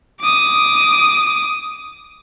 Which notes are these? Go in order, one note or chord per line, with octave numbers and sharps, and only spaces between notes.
D6 D#6